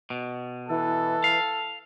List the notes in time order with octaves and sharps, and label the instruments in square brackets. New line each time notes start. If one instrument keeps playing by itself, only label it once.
[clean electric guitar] B2
[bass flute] E3 [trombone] A4
[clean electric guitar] F5